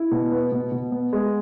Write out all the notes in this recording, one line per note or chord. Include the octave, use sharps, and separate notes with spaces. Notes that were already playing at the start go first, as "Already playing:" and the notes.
Already playing: E4
B2
B3
B2
B2
B3
G#3